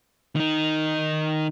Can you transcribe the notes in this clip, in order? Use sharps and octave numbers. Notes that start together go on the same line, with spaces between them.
D#3 D#4